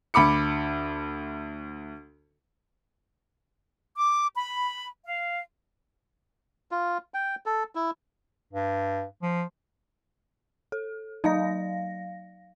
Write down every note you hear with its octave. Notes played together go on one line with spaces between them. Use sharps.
D2 B5 D6 C#7
D6
B5
F5
F4
G5
A4
E4
G2
F3
A4
F#3 D#4 F5 A#6